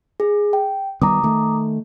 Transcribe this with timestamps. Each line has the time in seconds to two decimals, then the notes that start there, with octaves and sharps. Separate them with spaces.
0.20 G#4
0.53 G5
1.02 D#3 G3 B3 A#5 D6 D#6
1.23 D#3 A3